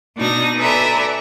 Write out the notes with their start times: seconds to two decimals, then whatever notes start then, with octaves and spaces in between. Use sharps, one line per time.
0.17 B2 D4 D#4 A#6
0.59 A4 B4 D5 E5 G#5 A#5